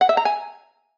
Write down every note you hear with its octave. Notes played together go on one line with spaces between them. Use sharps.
F#5
E5
A#5
G#5